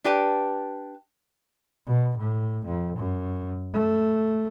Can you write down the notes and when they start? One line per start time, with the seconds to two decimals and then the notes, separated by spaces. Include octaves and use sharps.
0.04 D4 G4 B4 A5
1.87 B2
2.18 A2
2.65 F2
2.97 F#2
3.74 A3